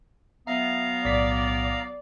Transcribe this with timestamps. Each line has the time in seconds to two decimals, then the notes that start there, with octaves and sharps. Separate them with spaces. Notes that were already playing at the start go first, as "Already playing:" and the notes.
0.47 F#3 B3 E5 F5 A#5
1.05 B1 A2 D5 B6